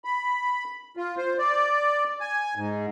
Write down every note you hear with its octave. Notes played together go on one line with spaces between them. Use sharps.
B5
F4
C5
D5
G#5
G#2